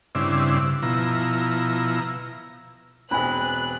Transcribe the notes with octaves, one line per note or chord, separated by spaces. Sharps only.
G2 C#3 C4 D4 E4
B2 F3 E4 A#5
E1 C4 D4 B4 G#5 B5 F#6